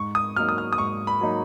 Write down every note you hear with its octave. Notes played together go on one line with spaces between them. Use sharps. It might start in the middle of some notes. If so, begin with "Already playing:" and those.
Already playing: G#2 C#6
D#6
F#3 A#3 D#4 F6
D#6
F6
D#6
G#2 C#6
B5
F#3 A#3 D#4